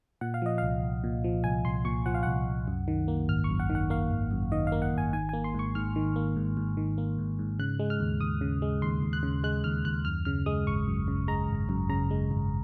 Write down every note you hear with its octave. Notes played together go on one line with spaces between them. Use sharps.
A#2 F#5
F5
F3 D#5
C2 F5
C2
A#2
F3
C2 G#5
C2 C6
A#2 C#6
F3 F#5
F5
C2 F#5
C2
F#2
D#3
A#3
G#1 F6
C#6
F#2
F#5
D#3
F#5
A#3 F5
G#1
F#2
D#3 D#5
F5
A#3
F#5
G#1 G#5
D#3 G#5
A#3 G#5
C6
G#2 C#6
G#2 F6
D#3
A#3
G#2
G#2
D#3
A#3
G#2
G#2
C#3 F#6
G#3
F6
D#2
D#2 D#6
C#3
G#3
D#2 C6
D#2
F#6
C#3
G#3 F#6
D#2 F6
D#2 F#6
F#2 F6
C#3 F6
G#3 D#6
G#1 C#6
F#2
C#3
G#3 A#5
G#1
F#2
C#3 A#5
G#3
G#1